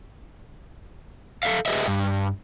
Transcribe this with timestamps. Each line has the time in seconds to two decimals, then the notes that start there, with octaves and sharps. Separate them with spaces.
1.43 A4 B4 E5 F5
1.66 G4 G#4 A#4 B4 D#5 E5
1.88 G2